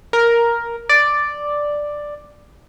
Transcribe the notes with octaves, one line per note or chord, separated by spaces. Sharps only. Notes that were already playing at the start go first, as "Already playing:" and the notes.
A#4
D5